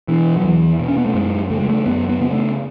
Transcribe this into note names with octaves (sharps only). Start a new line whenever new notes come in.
B2 E3
F#3
E2 E3
B2
C#4
B3
A3
F#2 G#3
C#3 A3
G#3
A3
F#2 B3
B3
C#3 B3
A3